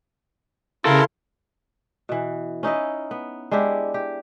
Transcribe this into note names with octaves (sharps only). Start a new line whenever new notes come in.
C#3 E4 A4 A#4 F5 C6
B2 E3
C#4 D#4 E4 D#5
B3
G#3 D4 E4 G4
G4